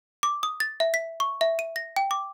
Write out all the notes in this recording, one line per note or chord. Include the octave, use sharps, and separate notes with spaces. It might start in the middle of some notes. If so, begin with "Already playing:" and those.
D6
D#6
A6
E5
B6
C#6
E5
D#7
A#6
G5
D6